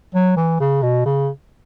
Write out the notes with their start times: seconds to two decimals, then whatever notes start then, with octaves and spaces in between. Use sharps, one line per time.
0.15 F#3
0.37 E3
0.60 C#3
0.83 B2
1.06 C#3